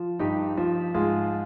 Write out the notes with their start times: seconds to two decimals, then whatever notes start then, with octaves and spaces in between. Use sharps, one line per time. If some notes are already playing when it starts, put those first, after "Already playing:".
Already playing: F3
0.19 G2 D#4 G4
0.57 F3
0.94 G#2 F4 G#4